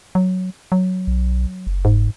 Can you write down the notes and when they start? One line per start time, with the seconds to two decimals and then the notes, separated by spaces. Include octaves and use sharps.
0.15 F#3
0.72 F#3
1.07 B1
1.67 F#1
1.85 G#2